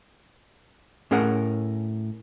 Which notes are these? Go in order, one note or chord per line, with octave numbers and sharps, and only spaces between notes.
A2 C#4 G#4 A#4 F#5